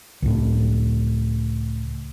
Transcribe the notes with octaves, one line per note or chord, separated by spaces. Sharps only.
C#2 A2